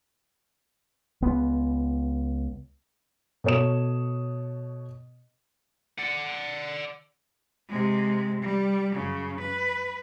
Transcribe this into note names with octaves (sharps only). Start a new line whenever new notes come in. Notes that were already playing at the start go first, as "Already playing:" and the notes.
C#2 B3
B2 A4 C#5 D#6 E7
D5 F#5
C3 G#3
G3
F#2 C#3
B4